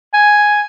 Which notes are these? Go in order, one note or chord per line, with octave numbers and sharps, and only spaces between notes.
G#5